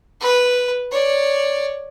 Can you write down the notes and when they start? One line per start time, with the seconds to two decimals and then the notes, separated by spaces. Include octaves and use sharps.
0.21 B4
0.92 C#5 D5